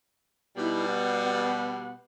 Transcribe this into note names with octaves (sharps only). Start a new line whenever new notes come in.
B2 G3 D#4 E4
B3 F#5